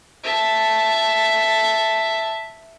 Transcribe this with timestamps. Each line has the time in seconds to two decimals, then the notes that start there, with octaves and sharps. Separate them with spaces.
0.24 E5 A5